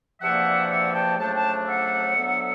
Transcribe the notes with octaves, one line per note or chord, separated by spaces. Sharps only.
E2 C3 F3 A#3 D4 E5 F#5
E5 F#5
G5 A5
F2 C#3 F#3 A3 D4 G5 A5
G5 A5
E5 F#5
D2 D3 F#3 B3